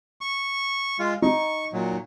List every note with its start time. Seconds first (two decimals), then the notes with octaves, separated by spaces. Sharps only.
0.21 C#6
0.99 G#3 F4
1.22 D#4 C#6
1.73 A#2 F#3